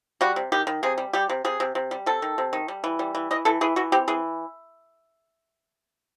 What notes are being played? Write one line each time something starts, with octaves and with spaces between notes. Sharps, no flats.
G3 F#4
C3
D#3 G4
D#3
C3 G#4
G3
G3 G4
C3
C3 G#4
C3
C3
G3
C3 A4
D#3
C3
D#3
G3
E3
G3
E3
E3 D#5
E3 A4
E3 G#4
E3 F#4
C4 G4
E3 G#4